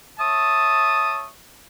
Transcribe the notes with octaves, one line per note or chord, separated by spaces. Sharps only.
C#5 E5 A5 D#6